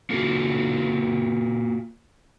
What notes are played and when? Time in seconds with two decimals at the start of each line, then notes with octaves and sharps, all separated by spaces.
0.10 A#3 F4 F#4 A4